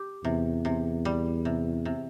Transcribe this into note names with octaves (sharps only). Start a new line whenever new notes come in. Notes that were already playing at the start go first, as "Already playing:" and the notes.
Already playing: G4
E2 C3
C3
G3
C3
C3